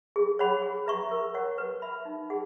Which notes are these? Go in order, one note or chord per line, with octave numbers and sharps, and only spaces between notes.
G#4
C#5 F#5 B5
G#4
B4 E5 A#5 C#6
A#4
C#5 F#5 C#6
B4
E5 B5
D#4
G#4 F#5